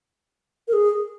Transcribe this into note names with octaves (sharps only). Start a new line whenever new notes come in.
A#4
G#4